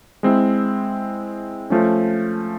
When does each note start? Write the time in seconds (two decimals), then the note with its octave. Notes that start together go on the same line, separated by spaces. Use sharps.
0.23 G#3 C4 E4
1.70 F3 A3 C#4